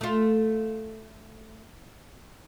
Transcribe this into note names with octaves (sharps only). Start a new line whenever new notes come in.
A3 F4